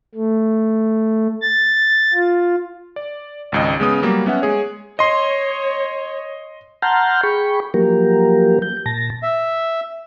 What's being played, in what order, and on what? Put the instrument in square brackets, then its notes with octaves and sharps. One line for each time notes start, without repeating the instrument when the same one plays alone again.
[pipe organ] A3
A6
F4
[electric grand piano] D5
G#1 C#2 D#5
C#3 G#3 B3 D#6
F#3 G3 A#3
B3 C#4 E5 F#5
G#3 G#4 C#5
[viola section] C#5 [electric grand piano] D#5 C6
[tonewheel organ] F#5 A5 A#5 C6 F6 G6
G#4 G5 B5 C#6
F3 F#3 A#3 G4 A#4
G6
A#2 A5 A#6
[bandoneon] E5